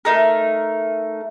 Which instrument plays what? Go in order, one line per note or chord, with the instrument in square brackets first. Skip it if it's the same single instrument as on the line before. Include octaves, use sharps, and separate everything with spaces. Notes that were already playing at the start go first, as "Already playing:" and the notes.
[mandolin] A3 D#4 A#4